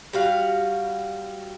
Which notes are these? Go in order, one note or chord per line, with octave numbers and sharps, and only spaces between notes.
G3 F#4 F5